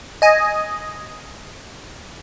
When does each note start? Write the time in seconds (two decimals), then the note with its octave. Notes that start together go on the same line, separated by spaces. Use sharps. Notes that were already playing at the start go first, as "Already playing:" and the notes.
0.22 D#5 G#5